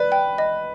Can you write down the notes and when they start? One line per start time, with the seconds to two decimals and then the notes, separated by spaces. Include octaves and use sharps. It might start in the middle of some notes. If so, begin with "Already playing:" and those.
Already playing: B4 D5
0.12 G5
0.38 D#5